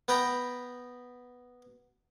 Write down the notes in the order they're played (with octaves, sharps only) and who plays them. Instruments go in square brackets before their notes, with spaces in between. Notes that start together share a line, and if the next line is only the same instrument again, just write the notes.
[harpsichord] B3 B4 G5 A#5